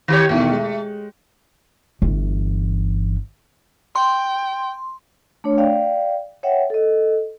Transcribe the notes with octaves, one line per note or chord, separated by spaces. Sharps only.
D#3 G4 C#5
E2 B2 D#3 A3
G#3
G1 E3
G5 C6
A3 D4 C#5
D5 F5 G5
C#5 E5 F#5 G5
A4 D#5